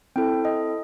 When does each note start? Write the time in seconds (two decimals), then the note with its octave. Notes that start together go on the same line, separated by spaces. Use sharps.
0.16 C4 E4 A4 G5
0.45 D#5